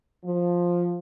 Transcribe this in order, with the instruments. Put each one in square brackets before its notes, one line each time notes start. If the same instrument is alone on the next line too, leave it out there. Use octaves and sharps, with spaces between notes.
[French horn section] F3